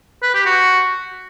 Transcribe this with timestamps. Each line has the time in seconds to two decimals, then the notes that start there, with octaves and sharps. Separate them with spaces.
0.23 B4
0.34 G4
0.46 F#4